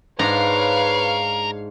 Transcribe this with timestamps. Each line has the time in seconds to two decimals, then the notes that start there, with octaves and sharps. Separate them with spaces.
0.19 G#2 D4 A#4 B4 C#5 F5 A#5